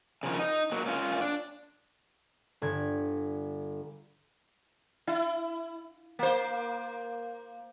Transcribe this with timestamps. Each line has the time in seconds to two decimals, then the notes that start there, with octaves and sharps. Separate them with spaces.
0.23 C#3 F3 A#4
0.38 D#4
0.72 F#3 A#3
0.86 A#3 C#4 F4
1.21 D4
2.62 G1 D3 G#6
5.07 E4
6.19 A#3 C5